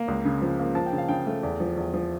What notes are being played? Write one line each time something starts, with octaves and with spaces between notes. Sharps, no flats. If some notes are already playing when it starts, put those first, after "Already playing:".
Already playing: A#3
C#2
C#3
F3
A#3
F3 A5
G5
C#3
F5
C#3 G5
A3
E2
F3
E2
F3